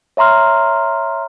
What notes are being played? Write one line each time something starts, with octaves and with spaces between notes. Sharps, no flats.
C#5 E5 A#5 C6 F6